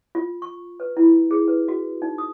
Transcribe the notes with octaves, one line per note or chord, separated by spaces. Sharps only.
F4
C#6
B4
E4
G#4
B4
F#4
D#4
D#6